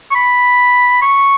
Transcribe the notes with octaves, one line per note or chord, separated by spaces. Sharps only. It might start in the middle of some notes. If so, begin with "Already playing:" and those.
C#6
B5
C#6